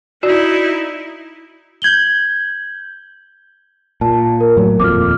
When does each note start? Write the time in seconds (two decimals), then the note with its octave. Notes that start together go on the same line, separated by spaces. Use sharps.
0.23 D#4 E4 F#4 D5
1.82 G6 G#6 F#7 G7
4.01 A#2 A5
4.40 A#4
4.57 A2 F#3
4.80 D#1 F2 A#3 D6 F6